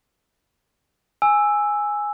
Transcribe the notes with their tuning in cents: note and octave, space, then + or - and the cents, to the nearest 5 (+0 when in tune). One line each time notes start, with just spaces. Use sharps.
G#5 +0 E6 +0